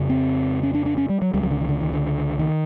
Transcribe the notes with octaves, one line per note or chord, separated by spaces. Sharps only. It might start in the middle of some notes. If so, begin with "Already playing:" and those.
Already playing: F2 C#3
C4
C#4
D4
D4
C#4
G3
F#3
C#2 C#3 G3
F#3
D3
D#3
D3
D#3
D3
D#3